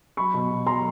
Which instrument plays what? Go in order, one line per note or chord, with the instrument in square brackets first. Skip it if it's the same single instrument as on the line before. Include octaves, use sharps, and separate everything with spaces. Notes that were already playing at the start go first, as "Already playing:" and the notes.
[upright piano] F#3 B5 C#6
B2
B2
F#3 A#5 C6